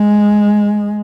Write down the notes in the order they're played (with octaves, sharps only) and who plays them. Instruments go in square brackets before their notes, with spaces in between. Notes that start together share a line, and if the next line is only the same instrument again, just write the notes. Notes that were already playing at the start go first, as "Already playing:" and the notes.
Already playing: [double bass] G#3